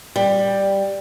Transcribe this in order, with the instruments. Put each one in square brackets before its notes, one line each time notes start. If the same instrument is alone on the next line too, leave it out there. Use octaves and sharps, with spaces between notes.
[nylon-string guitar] G3